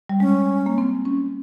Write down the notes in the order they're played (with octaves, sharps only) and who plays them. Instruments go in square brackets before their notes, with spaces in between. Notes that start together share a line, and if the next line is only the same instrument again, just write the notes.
[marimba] G3
[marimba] G#3 [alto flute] C#4
[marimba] A#3
C4
C#4